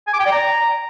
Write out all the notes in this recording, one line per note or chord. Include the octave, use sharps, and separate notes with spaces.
G#5
D6
G5
D5
A#5